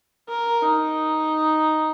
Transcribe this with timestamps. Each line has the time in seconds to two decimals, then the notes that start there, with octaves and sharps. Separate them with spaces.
0.29 A#4
0.63 D#4